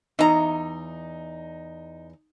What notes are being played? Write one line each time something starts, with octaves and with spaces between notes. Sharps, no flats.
E2 D#4 A#5